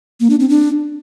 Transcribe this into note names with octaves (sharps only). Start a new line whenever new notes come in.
A#3
D4
C4
D4